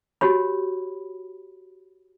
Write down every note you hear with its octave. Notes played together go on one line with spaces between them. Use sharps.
F#4 G4 C#5 B5